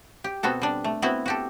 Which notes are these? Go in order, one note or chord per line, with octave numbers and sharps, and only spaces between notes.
G4
B2 B3 C4 F#4 A4
G3 D4
A3
B3 C4 E4 F#4 B4
F#4 G4 A4